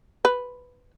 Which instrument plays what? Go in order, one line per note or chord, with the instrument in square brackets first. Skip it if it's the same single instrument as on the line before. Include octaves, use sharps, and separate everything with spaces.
[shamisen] B4